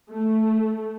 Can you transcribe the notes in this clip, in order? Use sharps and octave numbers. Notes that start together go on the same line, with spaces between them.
A3